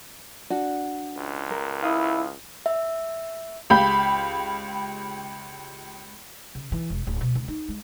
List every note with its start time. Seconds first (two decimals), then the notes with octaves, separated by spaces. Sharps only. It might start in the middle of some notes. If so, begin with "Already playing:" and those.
0.50 D4 F#4 F#5
1.17 C#2
1.50 A#4
1.83 E4 F5 D#6
2.66 E5
3.70 C#2 G4 F5 B5 G6
6.55 C#3
6.72 E3
6.90 E1
7.07 D1
7.21 B2
7.35 C#2
7.48 D#4
7.68 G#3